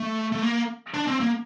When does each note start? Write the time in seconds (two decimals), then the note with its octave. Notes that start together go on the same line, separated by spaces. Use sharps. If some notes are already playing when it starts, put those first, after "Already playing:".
Already playing: A3
0.32 A3
0.42 A#3
0.94 D4
1.07 C4
1.20 A#3